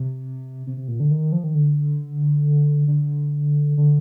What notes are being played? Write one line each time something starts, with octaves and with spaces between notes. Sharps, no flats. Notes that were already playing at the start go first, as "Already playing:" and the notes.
Already playing: C3
C3
C3
A#2
D3
D#3
F3
D#3
D3
D3
D3